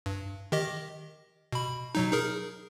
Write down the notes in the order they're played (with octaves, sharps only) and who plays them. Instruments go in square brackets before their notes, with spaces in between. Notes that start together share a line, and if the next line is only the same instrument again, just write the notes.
[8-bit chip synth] G2
D#3 G4 D#5
B2 B5
B2 F#3 D#4
D#4 G#4 A#4